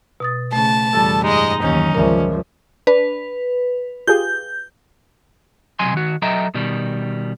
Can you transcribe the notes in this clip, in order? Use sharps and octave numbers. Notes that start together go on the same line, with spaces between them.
B2 D#6 A6
C#3 A3 A5
F2 C#3 E3 G3 A4 A6
G2 G#3 D#4 D#5
D#2 D#3 E3 F#3 C#4
C#2 F3 A#4 D5 E5
D4 B4
F4 G4 G#4 G6
B1 C3 F#3 G#5 C6
D#3 F#4
F#3 A4 D#5 E5 G5 A#5
B2 D#3 G3